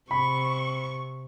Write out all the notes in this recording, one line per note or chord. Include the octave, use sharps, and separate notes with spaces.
C3 B5 C#6